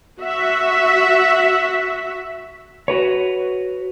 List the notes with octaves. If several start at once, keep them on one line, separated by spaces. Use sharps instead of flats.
F#4 E5
F#4 B4 C#5